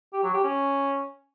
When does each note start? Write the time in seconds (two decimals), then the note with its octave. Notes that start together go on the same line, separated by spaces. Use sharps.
0.13 G4
0.23 F#3
0.34 G4
0.44 C#4